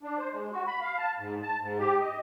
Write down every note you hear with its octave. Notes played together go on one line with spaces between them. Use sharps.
D4
C5
G#3
F#4
B5
F5
A5
G#2
A5
G#2
G4
D#5